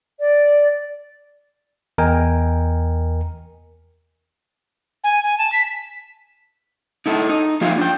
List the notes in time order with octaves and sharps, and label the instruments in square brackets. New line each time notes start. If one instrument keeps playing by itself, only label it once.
[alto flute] D5
[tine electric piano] E2 A#4 D#5 G5 G#5
[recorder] G#5
G#5
A5
B6
[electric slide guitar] D#4 E4 A4
D#4
F3 A#3 F4 G4 E5 F5
D4 G5